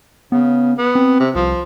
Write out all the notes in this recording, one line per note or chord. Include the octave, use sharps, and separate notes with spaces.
C#3 B3
B3
C4
C3
C2 F3